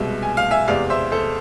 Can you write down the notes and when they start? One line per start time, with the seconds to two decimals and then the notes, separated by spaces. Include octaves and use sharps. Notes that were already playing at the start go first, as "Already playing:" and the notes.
Already playing: C2 B2 G#3 E5
0.23 G#5
0.37 F5
0.51 E5 G#5
0.68 E2 C3 G#3 D5 F5
0.90 C5 E5
1.11 A4 C5